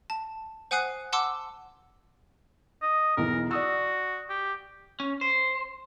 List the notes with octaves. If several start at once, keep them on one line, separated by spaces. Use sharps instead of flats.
A5
C5 F#5 G#5 D#6 F#6 C7
F#5 A5 C6 D6 E6
D#5
B1 E2 E3 A#4
F#4 D5 D#6 E6
G4
C#4
C5